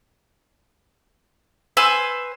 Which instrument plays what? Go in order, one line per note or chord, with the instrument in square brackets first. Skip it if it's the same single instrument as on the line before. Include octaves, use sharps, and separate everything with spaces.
[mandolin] B4 C5 G#5 E6